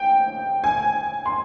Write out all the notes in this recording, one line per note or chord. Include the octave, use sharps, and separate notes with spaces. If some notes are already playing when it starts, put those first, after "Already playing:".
Already playing: G5
G#5
C6